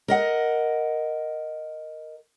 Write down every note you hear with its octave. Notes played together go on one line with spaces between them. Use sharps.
A#4 D#5 F#5